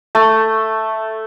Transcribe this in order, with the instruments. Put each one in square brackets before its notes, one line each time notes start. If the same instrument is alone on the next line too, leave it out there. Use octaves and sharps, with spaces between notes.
[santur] A3